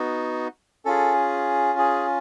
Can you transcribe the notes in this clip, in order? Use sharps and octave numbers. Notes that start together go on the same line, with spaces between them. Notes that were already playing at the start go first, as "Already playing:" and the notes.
Already playing: B3 D#4 F#4
C#4 F4 G#4 A4
G#4